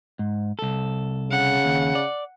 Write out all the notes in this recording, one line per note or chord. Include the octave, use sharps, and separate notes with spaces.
G#2
C2 A4
C#3 F#5
D#2
D5